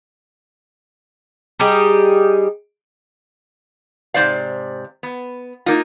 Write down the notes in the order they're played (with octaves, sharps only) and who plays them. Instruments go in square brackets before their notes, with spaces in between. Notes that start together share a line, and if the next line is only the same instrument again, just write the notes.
[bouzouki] G3 D#4 G4 G#4
[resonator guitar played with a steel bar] G#2 C3 A#3 C5 D5 F5
B3
A#3 D#4 F4